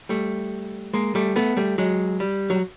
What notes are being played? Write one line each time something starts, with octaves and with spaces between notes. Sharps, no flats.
G3 A3
G#3 A#3
G3 A3
A3 B3
G3 A3
F#3 G#3
G3
F#3